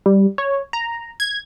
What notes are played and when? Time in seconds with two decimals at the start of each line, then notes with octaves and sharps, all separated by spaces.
0.06 G3
0.38 C#5
0.73 A#5
1.20 G#6